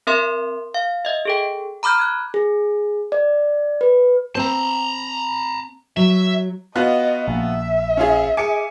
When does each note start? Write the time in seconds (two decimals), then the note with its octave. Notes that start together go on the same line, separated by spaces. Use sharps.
0.07 C4 A#4 E5 C6
0.74 F5
1.05 D#5 E5
1.25 G#4 A4 G5
1.83 A#5 B5 D6 F6 G6
1.99 F#6 G#6
2.34 G#4
3.12 D5
3.81 B4
4.35 C4 C5 A5 A#5
5.97 F#3 E5
6.75 B3 F4 F#4 D#5
7.28 A#1 E5
7.97 C#4 F4 G#4
8.37 G#4 G#5 D6 C#7